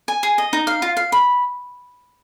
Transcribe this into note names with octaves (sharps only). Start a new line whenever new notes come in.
G#5
G#4
D#5
D#4
F5
F4
F5
B5